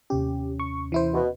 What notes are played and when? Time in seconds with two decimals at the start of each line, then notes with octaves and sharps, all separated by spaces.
0.10 D#2 C3 C#4 G4
0.60 C#6
0.92 E3 E4 C5
1.14 B2